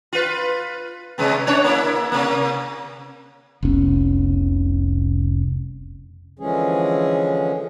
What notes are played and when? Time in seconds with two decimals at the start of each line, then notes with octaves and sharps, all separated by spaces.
0.13 F4 B4
1.18 C3 G#3 B3
1.47 C#4 D4 C#5
1.64 A#3 E4
2.12 C3 A#3
3.63 F1 C2 B3 C#4
6.39 D3 E3 F3 G#3 C#4 G#4